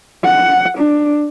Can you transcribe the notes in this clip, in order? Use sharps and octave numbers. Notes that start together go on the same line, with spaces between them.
F#5
D4